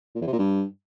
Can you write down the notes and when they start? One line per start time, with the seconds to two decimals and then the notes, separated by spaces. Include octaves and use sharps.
0.15 A#2
0.21 E2
0.27 C3
0.33 A#2
0.39 G2